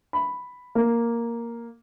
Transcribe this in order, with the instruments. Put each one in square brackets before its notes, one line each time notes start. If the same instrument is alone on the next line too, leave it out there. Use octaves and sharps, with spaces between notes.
[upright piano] B5
A#3